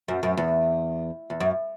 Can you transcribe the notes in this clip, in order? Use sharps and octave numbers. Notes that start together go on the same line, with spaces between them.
F#2
F#2
E2
E2
F#2